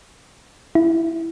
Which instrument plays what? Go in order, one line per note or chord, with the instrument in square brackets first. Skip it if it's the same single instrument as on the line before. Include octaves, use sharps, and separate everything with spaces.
[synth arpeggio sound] E4